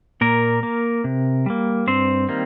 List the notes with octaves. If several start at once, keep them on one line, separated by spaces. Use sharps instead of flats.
A#2 A#3 A#4
A#3
C3
G3 A#3
G2 C4 C5
D#3 G3 A#3